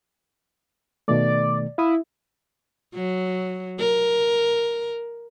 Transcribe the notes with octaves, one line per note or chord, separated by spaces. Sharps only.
B2 D#3 A3 D5
E4 F5 D#6
F#3
A#4